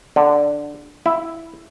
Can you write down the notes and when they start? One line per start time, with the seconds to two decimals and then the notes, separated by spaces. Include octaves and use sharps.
0.16 D3
1.06 E4